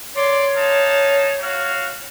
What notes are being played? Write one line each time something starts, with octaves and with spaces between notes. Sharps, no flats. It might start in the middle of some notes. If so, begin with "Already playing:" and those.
C#5 D5 C6
D#4 F5 A5
F#4 F5